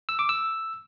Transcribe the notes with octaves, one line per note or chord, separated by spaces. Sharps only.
E6
D6
E6